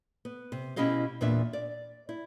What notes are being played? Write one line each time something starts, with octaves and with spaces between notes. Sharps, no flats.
B3
C3
B2 C#4 E4 G4 D#5 F5
E2 A#2 B3 D4 E5
D5
E4